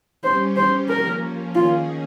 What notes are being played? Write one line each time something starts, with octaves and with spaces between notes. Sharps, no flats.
G3 C#4 G4 C5
C5
F3 A#3 C#4 A#4
D#3 A#3 C#4 F4 G#4